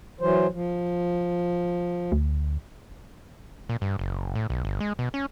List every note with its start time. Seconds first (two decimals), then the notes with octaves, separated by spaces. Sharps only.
0.21 E3 F#3 C5
0.52 F3
2.12 D2
3.69 A#2
3.81 G2
3.99 F#1
4.35 A2
4.50 B1
4.65 G1
4.80 G#3
4.99 B2
5.14 C#4